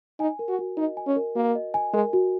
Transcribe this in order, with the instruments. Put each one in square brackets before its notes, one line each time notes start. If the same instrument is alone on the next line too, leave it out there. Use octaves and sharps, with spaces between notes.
[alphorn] D#4 [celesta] G#5
[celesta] A#4
[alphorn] F#4
[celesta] F#4
[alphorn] D#4 [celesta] D#5
[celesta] G#5
[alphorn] C#4
[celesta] A#4
[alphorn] A#3 [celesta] F#4
[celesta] D#5
G#5
[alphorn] G#3 [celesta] A#4
[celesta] F#4